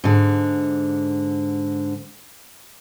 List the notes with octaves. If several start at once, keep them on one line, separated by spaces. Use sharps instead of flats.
G#2 D3